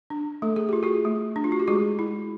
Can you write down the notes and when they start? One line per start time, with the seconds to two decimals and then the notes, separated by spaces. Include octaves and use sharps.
0.10 D4
0.42 A3 A4
0.56 G#4
0.69 F4 G4
0.83 F#4 G#4
1.05 A3
1.36 D4
1.44 F4
1.52 F#4
1.60 G4
1.68 G#3 F#4 G#4
1.99 E4